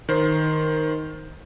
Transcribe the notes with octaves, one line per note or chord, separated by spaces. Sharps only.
D#3 C5